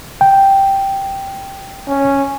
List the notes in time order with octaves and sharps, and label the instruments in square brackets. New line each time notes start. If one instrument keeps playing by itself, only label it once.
[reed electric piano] G5
[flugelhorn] C#4